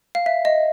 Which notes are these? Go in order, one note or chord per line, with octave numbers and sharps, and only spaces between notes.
F5
E5
D#5